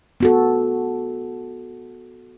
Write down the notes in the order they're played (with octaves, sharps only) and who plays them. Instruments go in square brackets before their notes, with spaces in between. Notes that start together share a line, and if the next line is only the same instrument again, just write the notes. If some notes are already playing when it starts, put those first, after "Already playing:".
[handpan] B3 F#4 A4